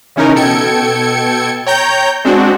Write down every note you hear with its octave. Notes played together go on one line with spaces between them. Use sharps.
C#3 E3 C#4 D#4 A#4
B2 A4 G5 G#6 C#7
C#5 G5 A#5 G6
G#3 C4 D4 F#4